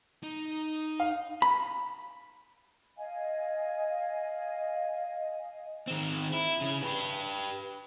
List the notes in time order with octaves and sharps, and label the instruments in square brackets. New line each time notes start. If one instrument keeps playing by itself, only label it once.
[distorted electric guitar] D#4
[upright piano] F5
[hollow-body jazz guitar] B5
[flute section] D#5 F5 G#5
[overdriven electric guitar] D#3 C4
E4
C#3
G4 B4